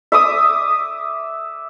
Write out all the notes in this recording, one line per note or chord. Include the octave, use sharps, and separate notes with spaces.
E5 D6 D#6